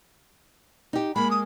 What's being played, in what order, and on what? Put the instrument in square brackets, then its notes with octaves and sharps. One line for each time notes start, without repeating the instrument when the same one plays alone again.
[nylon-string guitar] D#4 G4
[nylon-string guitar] G#3 A#3 [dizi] B5
[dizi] D#6